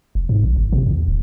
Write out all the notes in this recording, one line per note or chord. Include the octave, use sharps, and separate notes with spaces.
F1
G#2
A#1
G1
C3
E2
D1